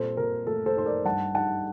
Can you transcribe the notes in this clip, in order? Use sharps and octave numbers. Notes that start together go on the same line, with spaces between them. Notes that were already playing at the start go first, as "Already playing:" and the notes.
Already playing: A#2 G3 C4 A4 C5
A#2 A#4
A3 A4
A4 C5
D#4 C5
A#4 D5
G2 F#5 A5
D#4 F#5 A5